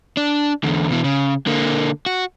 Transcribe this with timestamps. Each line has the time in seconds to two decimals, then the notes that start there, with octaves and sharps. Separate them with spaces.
0.17 D4
0.64 E2 D3
0.90 B2 E3
1.04 C#3
1.47 D3 A#3
2.06 F#4